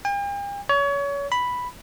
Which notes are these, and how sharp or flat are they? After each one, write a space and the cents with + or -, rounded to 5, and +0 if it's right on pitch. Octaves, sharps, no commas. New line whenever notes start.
G5 +45
C#5 +30
B5 +0